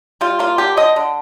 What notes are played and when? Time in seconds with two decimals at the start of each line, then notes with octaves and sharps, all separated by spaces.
0.21 G3 F4
0.39 A#3 F4
0.58 D3 G4
0.77 D3 D#5
0.96 D3